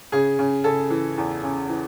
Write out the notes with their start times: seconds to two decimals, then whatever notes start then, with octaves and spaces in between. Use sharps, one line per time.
0.12 C#3 G#4
0.39 C#3
0.64 C#3 A4
0.90 E3
1.18 E2
1.43 C#3
1.69 E3